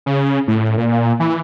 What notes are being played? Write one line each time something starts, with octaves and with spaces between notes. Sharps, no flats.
C#3
A2
A#2
E3